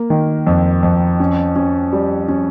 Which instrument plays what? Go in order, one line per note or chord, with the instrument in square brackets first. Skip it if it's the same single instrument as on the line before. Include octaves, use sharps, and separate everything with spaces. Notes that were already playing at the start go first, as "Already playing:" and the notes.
Already playing: [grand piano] A#3
D#3
F2
F2
C#4
C#4
G3
C#4